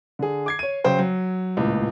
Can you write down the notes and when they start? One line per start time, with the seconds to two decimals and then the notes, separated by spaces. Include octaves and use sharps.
0.19 D3 G#4
0.46 D6 G#6 C7
0.59 C#5 D#7
0.84 C#3 F#3 C5 G5
0.99 F#3
1.57 D#1 C#2 A2